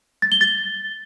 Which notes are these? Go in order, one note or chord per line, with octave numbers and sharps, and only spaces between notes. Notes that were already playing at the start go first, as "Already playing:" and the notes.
A6
G7
A6